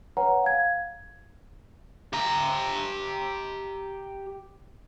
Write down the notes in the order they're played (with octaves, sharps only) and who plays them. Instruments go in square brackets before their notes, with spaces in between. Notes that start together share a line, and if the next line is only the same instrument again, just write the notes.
[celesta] B4 C#5 F#5 G#5 A#5
F5 G#6
[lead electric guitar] G4 A#5